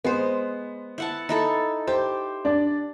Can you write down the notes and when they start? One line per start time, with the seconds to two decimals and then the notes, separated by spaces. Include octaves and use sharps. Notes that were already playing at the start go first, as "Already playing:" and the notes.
0.04 G#3 B3 C5
0.98 E4 F#5 A5
1.29 D#4 E4 A4
1.87 G4 C5
2.45 D4 D5